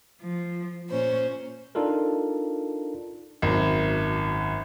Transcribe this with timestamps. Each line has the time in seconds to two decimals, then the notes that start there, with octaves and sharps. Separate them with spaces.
0.22 F3
0.90 A#2 C#4 C5
1.75 D4 D#4 F4 A4 A#4
3.42 G#1 F#2